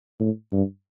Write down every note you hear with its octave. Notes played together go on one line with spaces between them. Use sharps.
A2
G2